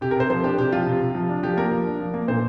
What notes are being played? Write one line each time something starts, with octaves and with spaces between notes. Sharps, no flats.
C3 G4
A#4
C3 C5
F3 C5
D4 G4
C3 G4
F3 F4
C3
C3
F3
D4
F3 G4
A#3 A#4
F3
D4
F3
A#3
A#2 C5